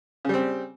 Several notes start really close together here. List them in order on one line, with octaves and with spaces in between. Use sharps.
C#3 G3 C4